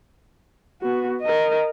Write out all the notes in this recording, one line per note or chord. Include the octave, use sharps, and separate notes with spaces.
B3 F#4
A#4 D#5